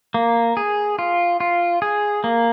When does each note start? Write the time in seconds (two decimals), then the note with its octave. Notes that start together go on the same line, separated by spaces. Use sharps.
0.14 A#3
0.57 G#4
0.99 F4
1.40 F4
1.82 G#4
2.24 A#3